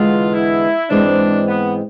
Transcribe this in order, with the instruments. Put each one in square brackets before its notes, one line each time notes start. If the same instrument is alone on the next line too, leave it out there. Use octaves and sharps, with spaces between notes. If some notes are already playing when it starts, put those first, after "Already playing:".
Already playing: [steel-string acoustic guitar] E2 D3 G#3 B3 [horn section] F4
[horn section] E4
[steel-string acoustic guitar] G#2 E3 G#3 C4 [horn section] D4
[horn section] B3